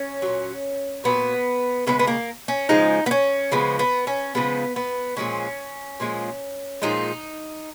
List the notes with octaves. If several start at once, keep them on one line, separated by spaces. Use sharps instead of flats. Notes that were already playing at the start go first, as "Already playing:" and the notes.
Already playing: C#4
A#2 F#3
A#2 F#3 B3
C#3 F3 G#3 B3
B3
A#3
C#4
C#3 F3 G#3 D#4
B3
C#4
C#3 F3 G#3 B3
B3
C#4
C#3 F3 G#3 B3
B3
A#2 F3 G#3 C#4
A#2 F3 G#3
A#2 F3 G#3 D#4